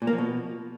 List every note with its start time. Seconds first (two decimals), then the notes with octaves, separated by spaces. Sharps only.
0.02 A#2
0.07 A#3
0.13 F3
0.18 B2